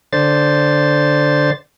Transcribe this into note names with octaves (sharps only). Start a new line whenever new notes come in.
D3 C5 A6